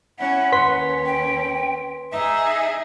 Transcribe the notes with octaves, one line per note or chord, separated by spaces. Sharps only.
C#4 E4 F#5
D#2 C#4 B4 C6 B6
G5
D#4 G#4 E5